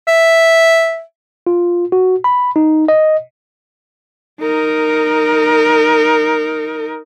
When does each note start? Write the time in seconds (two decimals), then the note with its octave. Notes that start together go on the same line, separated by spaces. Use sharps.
0.08 E5
1.47 F4
1.92 F#4
2.24 B5
2.56 D#4
2.88 D#5
4.42 D#4 A#4